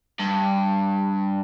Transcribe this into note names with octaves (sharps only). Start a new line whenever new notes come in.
G2